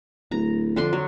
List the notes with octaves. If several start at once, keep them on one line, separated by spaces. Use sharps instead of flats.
D1 A#5
F2 D3 D4 C6
F#3